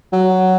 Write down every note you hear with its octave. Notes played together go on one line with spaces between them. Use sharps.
F#3